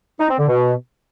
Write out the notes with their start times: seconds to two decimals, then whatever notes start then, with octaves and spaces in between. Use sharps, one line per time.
0.19 D#4
0.29 C4
0.38 D3
0.48 B2